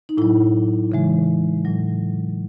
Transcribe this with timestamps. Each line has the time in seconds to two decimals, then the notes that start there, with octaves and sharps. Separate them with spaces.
0.09 D#4
0.17 A2 F#3 E4
0.92 C#3 E3 G#3
1.65 A2 F#3